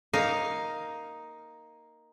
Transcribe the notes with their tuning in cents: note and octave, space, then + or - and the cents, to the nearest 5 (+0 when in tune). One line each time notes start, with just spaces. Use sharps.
A#3 +0 D#4 +5 F5 +0